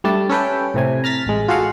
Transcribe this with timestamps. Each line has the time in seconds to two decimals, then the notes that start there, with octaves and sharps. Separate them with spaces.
0.04 G3 A3 D4 A5
0.29 C#4 A4 B4 G5
0.74 A2 C3 G#5
1.04 A#5 F6 A6 B6
1.26 A1 G#3
1.48 F4 F#4 G#4 A4 F5 F#5